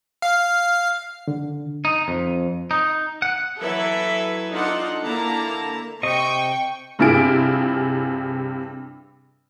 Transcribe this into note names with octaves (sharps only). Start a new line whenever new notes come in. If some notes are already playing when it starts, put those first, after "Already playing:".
F5
D3
D#4
F2
D#4
F#5
E3 F#3 E4 A4 B4 E5
D4 D#4 F4 A4 F#5
D3 A#3 E4 A5 A#5
C3 D#5 G5 C#6
G2 C3 E4 F4 G#4 D7